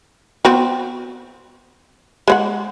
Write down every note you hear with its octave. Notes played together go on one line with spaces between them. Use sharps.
B3 C4 F#4
G#3 C5 F#5